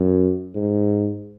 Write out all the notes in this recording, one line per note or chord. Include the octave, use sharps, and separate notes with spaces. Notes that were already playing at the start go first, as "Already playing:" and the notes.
Already playing: F#2
G#2